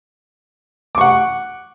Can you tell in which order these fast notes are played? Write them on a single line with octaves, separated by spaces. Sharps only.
D6 C#6 F#5